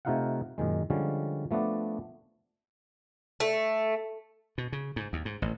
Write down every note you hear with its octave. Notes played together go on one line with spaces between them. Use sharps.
C3 A3 D#4 F4 F5 F#5
F#2 A#2 D#3 G#3
D3 F3 G3 G#3 C#4
F3 A3 B3 D4 D5
A3
B2
C#3
G#2
D#2
G#2
A1